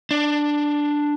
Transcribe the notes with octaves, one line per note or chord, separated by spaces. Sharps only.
D4